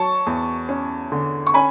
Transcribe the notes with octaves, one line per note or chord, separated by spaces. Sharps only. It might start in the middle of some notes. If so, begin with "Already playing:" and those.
Already playing: F#3 A5 C#6
E2
C#4
D3
C#6
C#4 G#5 B5